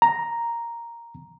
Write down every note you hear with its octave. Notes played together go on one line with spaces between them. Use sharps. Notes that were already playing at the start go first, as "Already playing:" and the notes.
A#5